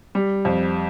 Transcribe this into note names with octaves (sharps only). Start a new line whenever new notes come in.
G3
F2